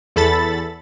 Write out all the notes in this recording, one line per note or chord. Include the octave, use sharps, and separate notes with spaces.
E2 A4 B5 A6